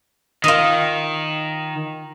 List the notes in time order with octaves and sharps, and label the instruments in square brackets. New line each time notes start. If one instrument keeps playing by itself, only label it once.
[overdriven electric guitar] D#3 [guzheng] F4 D#5